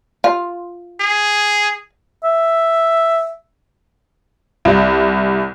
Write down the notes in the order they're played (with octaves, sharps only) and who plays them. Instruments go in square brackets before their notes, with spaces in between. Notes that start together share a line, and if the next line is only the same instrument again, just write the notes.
[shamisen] F4
[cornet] G#4
[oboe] E5
[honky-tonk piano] C2